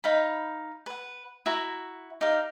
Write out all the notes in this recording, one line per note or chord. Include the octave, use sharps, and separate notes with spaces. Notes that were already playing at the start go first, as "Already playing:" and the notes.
D#4 F5 B5
B4 F#5
E4 F#4 A#5
D#4 G4 F5